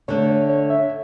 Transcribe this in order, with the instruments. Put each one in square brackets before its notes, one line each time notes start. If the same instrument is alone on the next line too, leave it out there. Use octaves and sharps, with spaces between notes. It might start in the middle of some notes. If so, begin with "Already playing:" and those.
[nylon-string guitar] D3 A3 D4 [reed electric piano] C#5
[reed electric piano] C#5
C#5
E5